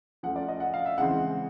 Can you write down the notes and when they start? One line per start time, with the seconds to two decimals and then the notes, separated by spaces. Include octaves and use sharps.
0.23 F3 A3 C#4 F#5
0.36 D5
0.48 D#5
0.60 F#5
0.74 F5
0.86 E5
0.98 C#3 E3 G#3 C4 F#5